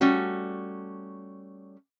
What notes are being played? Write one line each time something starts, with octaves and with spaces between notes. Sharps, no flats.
G3 A3 C#4 F#4